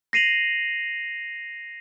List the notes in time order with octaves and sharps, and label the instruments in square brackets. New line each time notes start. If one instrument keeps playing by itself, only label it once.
[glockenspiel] A#6 C7 D#7 F7 F#7